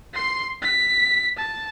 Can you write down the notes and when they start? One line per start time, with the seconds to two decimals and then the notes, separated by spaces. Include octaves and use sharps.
0.14 C6 C7
0.62 B6
1.37 A5